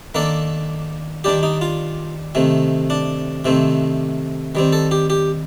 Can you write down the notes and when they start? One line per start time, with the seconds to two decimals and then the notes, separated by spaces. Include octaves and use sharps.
0.15 D#3 A#3 D4 A4
1.24 D#3 G3 D4 G4
1.43 D#4
1.61 F4
2.35 C3 D#3 A3
2.90 D4
3.45 C3 D#3 A3 C4
4.55 D#3 G3 C4
4.73 A4
4.91 G4
5.10 G4